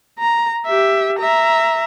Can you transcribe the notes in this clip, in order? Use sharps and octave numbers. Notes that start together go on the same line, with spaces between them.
A#5
G4 E5
E5 A#5